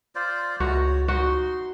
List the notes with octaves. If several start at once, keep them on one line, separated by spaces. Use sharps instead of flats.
F4 C5 D5
C#2 A3 F#4 A#5
C#5
D#4 F#4 C6